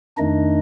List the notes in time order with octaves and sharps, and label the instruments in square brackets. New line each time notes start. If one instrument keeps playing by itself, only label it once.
[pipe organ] F2 D#3 A3 D4 D#4 D#5